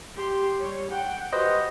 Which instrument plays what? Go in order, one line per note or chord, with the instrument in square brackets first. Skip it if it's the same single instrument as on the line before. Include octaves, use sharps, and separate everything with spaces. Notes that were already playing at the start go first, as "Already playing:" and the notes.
[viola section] G4 C6
G3 C#5
F#5 G5
[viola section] F#4 G4 [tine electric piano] B4 C5 D#5